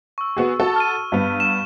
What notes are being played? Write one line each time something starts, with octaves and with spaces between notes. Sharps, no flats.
C#6 E6
B3 F#4 G#4
F#4 A4 A5
F6 D#7
G2 B3
E7